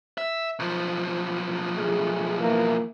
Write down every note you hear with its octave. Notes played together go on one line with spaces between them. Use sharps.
E5
B1 F3
A3 G#4
E3 A#3